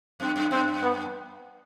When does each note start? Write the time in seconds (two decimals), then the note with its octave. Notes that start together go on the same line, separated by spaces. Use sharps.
0.20 F#2 C4
0.36 F#2
0.51 F#2 C4
0.81 B3